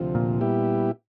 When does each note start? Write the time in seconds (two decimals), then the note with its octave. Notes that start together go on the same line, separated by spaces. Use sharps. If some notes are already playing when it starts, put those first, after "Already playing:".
Already playing: D2 C3 F3
0.15 A#2
0.41 G3 B3 E4 G4